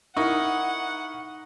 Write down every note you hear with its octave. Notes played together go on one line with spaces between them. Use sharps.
D#4 E4 A#4 F#5 C#6